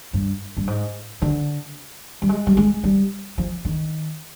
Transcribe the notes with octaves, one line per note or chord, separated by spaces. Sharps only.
G2
G2
G#2
D3
G3
G#3
G3
G#3
G3
F3
D#3